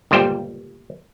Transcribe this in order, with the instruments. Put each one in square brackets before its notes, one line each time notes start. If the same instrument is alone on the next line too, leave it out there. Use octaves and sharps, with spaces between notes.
[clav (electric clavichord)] G1 C#2 A#2 G3 C5 G5